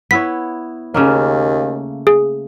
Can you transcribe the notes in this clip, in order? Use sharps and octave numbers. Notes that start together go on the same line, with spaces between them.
B3 E4 C#5 B6
D#2 C#3 A3 A#3
G#4